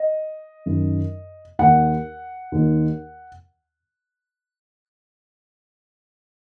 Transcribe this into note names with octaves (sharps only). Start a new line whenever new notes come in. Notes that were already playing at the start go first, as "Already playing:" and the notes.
Already playing: D#5
F#2 D#3
D#2 D#3 F#5
D#2 D#3